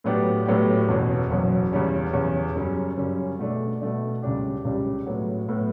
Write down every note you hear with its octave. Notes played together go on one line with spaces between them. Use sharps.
A2 F#3 B3 D4 G4
A2 F#3 B3 D4 G4
F#1 E2 B2 F#3
F#1 E2 B2 F#3
E2 C#3 G3 C#4
E2 C#3 G3 C#4
F#2 C#3 G3 C#4
F#2 C#3 G3 C#4
B2 A3 D4
B2 A3 D4
C#2 C#3 G3 D4 G4
C#2 C#3 G3 D4 G4
A2 F#3 B3
A2 F#3 B3